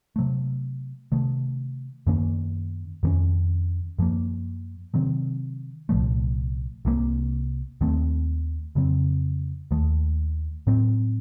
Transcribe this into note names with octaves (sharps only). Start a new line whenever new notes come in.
C3 F#3 A3
C3 D#3 A3
F#2 D#3 A#3 C#4
F2 D#3 A#3 C#4
F#2 F3 A#3
C3 D#3 F#3 C4
C2 A#2 F3 A3
C2 C3 F3 A#3
D#2 D#3 A3 C4
F2 C#3 F#3 C4
D#2 D#3 A3
A2 F#3 C4